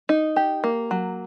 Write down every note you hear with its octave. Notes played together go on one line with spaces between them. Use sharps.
D#4
G4
A#3
F#3